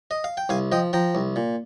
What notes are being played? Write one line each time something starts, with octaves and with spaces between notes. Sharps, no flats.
D#5
F5
G5
C2 F5 G#5
F3 D#5 G5
F3 G5 A#5
C2
A#2